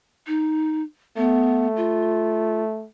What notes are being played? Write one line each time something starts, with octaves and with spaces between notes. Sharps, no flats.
D#4
A3 B3
F4